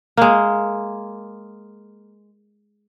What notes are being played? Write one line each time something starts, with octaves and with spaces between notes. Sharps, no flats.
G#3 A#3